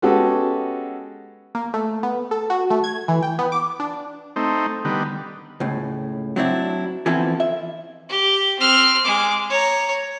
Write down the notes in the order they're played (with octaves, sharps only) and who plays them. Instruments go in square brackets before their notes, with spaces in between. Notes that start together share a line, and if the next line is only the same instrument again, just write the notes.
[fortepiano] G#3 B3 C#4 F#4 G4 A4
[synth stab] A#3
A3
B3
A4
F#4
A3
G#6
E3
G5
B3
D6
D4
[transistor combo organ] A3 C4 D#4
D3 D#3 G3 B3
[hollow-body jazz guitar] C#2 A2
F#3 C4 D4 E4
E3 F3 B3 C4 E4 A4
E5
[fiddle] G4
C4 F6
G#3 D6
C#5 A#5